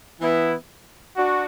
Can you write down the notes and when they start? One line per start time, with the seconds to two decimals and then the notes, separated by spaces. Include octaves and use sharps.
0.19 E3 B3 E4
1.16 D4 F#4